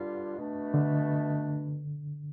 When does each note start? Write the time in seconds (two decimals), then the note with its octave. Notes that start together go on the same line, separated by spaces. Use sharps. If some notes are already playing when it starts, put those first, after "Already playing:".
Already playing: G2 D3 G3 D4 F4
0.37 B2 A3 D4
0.74 D3